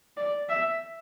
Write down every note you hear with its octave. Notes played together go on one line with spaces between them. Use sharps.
D5
E5